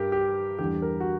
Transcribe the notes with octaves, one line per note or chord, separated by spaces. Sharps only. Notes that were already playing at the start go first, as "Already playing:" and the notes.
Already playing: G2 G3 G4 A#4
G4
E2 D3 G3 G4
A#4
F#4